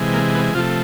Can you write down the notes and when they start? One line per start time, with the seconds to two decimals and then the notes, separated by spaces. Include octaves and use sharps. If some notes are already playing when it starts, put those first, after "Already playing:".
Already playing: C3 E3 G#3
0.14 A#3
0.35 B3
0.54 C3 F3 A3 F4